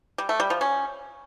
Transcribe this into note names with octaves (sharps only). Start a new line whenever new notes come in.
G3
A3
G3
F3
C#4